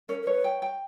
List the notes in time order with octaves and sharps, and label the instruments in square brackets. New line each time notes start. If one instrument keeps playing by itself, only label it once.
[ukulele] C#4 [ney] A#4
[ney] A#4
[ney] B4 [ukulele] C#5
[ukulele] G5
G5